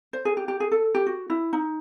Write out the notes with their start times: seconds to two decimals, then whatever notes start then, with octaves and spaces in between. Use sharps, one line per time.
0.13 C5
0.25 G#4
0.37 G4
0.48 G4
0.60 G#4
0.71 A4
0.95 G4
1.07 F#4
1.30 E4
1.53 D#4